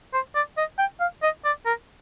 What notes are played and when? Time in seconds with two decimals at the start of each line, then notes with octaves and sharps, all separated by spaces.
0.14 C5
0.35 D5
0.57 D#5
0.79 G5
1.00 F5
1.23 D#5
1.45 D5
1.66 A#4